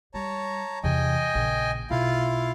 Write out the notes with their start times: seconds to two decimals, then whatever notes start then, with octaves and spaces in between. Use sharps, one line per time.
0.14 G3 C#5 A5 A#5
0.84 E2 C3 D#5 G5 G#5
1.35 A#1 C#3
1.90 B1 E4 F4 F5